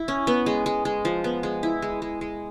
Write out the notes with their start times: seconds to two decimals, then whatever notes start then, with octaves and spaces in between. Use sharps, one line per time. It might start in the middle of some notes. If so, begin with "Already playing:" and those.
Already playing: E4
0.08 C#4
0.27 B3
0.46 G#3
0.66 G#3
0.85 G#3
1.05 F3
1.24 B3
1.43 G#3
1.63 E4
1.82 G#3
2.02 G#3
2.21 G#3